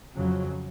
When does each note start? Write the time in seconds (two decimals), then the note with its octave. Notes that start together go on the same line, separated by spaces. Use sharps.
0.15 F2 C#3 F#3